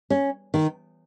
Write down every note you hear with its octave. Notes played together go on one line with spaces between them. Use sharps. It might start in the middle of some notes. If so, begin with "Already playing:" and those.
C#4
D#3